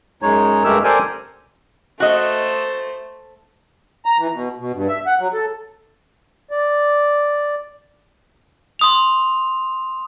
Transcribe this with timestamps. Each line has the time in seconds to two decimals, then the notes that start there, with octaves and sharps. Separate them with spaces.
0.22 F#2 G#3 D#4 C#5
0.64 G2 G#3 A3 G4 A#4 E6
0.84 G4 A4 A#4 C5 D5 G#5
2.00 A3 F#4 C5 D#5
4.05 A#5
4.19 E3
4.33 B2
4.59 B2
4.74 G2
4.89 E5
5.06 F#5
5.20 F#3
5.34 A4
6.51 D5
8.79 C6 D#6 F7